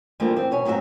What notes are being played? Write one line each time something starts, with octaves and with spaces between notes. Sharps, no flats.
E3 F3 G3 A3 A#3 D4
C4
B2 C#5 G#5
G#2 F#3 C4 G#4 E5